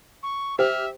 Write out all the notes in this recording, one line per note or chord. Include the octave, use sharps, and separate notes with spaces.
C#6
G4 C5 E5 F6